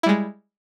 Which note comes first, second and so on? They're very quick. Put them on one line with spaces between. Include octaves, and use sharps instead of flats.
E4 G3 G#3